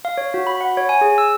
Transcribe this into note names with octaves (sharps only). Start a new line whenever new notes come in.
F5
C#5
F#4
B5
F#5
C#5
G#5
G#4
E6